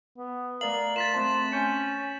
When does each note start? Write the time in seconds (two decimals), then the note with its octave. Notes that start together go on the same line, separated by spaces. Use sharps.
0.17 B3
0.61 A3 A#4 D5 F5 F#7
0.96 F4 A6 B6 E7
1.14 A3 C4 C5 A5
1.52 C#4 G#5 G6 C#7